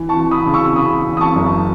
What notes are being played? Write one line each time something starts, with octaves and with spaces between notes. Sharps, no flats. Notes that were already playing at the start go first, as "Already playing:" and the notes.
Already playing: E3
A5 C#6
E3
B5 D#6
C#3
C#6 E6
C#3 B5 D#6
E2
D#6
A5 C#6
F#1